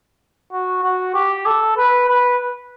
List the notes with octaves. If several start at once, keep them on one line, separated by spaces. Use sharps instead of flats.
F#4
F#4
G4
A4
B4
B4